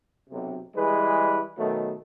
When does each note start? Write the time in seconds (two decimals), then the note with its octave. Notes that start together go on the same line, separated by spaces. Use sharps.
0.30 B1 C3
0.75 E3 G3 G#3 G#4 B4
1.58 B2 D#3 F#3 A3